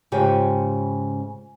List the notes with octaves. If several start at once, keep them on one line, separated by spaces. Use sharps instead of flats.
G#2 C#3 F4 G4 C#5 G#5